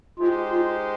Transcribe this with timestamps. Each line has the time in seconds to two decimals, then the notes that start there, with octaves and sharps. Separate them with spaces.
0.19 G#3 D#4 F4 G4 C5
0.51 F4